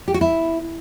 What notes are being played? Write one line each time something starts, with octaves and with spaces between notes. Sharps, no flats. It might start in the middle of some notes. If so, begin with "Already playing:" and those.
G4
F#4
E4